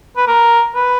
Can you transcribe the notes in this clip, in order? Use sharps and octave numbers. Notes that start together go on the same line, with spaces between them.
B4
A#4
B4